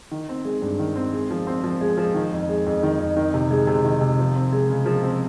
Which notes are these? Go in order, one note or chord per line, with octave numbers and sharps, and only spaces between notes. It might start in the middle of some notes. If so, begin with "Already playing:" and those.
D#3
C4
G#3
G2
D#3
C4
G#3
F3
C4
F3
G#3
F3
D#3
F2
G#3
F2
D#3
F2
D#3
C3
G#3
C3
D#3
C3
F3
C4
G#3
C#3
F3
C4